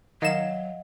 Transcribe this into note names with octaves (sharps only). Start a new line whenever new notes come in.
D#3 F#3 D#5 F5 F#5 E7